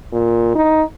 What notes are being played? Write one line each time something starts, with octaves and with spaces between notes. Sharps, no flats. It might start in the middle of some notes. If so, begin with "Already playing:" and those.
A#2
D#4